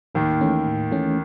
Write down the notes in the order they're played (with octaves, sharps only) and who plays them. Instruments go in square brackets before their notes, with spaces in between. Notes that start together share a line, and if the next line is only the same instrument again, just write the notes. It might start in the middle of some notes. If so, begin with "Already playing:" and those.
[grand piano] D#2 D#3 [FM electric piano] A2
[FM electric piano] E3 A3 C#4
A2
E3 A3 C#4